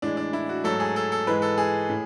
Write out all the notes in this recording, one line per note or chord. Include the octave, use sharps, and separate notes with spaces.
A2 E3 G#3 D4
D4
E4
F#4
G#2 F#3 A3 A4
G#4
A4
A4
G#2 E3 G#3 B4
A4
G#4
A2